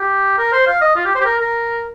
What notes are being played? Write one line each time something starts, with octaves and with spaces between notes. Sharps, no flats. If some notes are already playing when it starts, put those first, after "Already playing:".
Already playing: G4
A#4
C5
F5
D#5
F4
G4
C5
G4
A#4
A#4